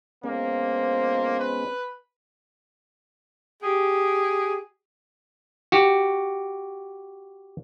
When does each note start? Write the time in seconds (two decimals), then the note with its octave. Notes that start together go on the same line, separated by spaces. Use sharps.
0.24 F2 G#3 A#3 B3 C#4 C5
1.40 B4
3.63 G4 G#4
5.72 F#4 G4